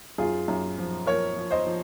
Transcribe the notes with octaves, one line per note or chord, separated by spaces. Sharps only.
F#2 F4 G#4
F#2
F3
F3 A#4 C#5
F3
C5 D#5
F3